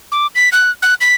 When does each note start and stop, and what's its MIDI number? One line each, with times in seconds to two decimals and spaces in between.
0.12 0.27 86
0.35 0.49 95
0.52 0.71 90
0.82 0.94 90
1.01 1.15 95